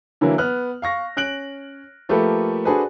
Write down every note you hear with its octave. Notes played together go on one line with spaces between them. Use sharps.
D3 E3 F#3 A#3 E4
B3 F6 F#6
F5 C#6 A#6
C#4 F#6 D7 F#7
F3 A3 A#3 G4 A4 B4
D4 F#4 G#4 A4 B4 C5